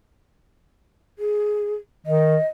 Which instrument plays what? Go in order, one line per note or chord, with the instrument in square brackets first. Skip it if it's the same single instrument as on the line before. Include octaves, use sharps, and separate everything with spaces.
[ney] G#4
[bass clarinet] D#3 [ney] D#5